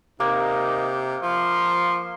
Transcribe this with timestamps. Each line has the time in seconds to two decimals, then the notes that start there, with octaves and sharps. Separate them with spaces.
0.20 C3 A#3 D#4
1.23 F3 C6